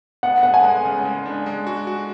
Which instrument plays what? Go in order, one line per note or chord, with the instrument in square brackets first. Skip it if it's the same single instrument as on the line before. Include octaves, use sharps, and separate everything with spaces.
[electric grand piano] B3 [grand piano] F#5
[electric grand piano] B3 [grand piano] F#5
[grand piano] G#5
[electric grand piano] G#3
C#3
G#3
D4
G#3
F#4
F#4